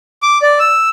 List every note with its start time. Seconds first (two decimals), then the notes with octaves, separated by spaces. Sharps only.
0.23 D6
0.42 D5
0.60 E6